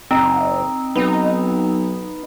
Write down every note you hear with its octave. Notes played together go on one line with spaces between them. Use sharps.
F#1 C4 D#4
B1 B3 D#4